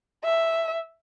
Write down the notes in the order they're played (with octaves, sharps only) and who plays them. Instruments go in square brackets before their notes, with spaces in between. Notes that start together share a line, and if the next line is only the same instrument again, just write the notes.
[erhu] E5